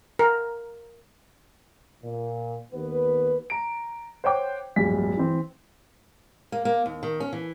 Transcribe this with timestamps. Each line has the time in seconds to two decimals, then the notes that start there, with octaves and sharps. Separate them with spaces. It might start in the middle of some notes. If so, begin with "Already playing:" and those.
0.19 A#4
2.04 A#2
2.73 D#2 B3 B4
3.50 A#5 D7
4.24 C5 C#5 F#5 G5 D6
4.76 D1 A#1 G2 B6
5.17 E3 C4
6.52 A#3
6.65 A#3
6.86 D#2
7.03 D#3
7.20 C#4
7.33 E3